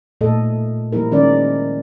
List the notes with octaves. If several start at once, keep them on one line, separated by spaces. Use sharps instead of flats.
A#2 A3 A4 D#5
F3 G3 A#3 E4 A#4
D#3 G#3 C#4 A#4 D5